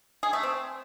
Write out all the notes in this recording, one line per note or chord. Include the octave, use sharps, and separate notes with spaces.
G#4
A3
C4